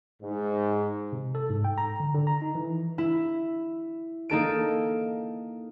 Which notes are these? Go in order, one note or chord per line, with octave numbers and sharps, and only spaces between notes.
G#2
C3
A4
G#2
G5
A#5
D3
D3
A#5
D#4
E3
E4
A#3 D#4 A4 D7